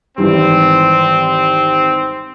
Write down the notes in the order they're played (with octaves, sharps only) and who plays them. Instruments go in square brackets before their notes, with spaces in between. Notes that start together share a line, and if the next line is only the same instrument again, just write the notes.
[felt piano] G#1 E3 G3 [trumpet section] C4